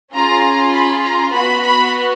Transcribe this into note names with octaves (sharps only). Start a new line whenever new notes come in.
C#4 F4 G#4 A#5
B5
A#5
B3 F#4 B5
B5